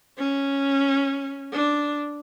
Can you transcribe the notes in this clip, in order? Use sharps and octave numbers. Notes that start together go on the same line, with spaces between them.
C#4
D4